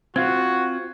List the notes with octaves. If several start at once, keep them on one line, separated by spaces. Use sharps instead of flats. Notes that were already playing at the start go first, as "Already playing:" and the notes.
C4 F4 F#4 C5 G#6